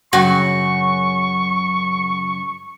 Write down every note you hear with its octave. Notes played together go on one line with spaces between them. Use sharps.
F#2 C#3 F#4 C#6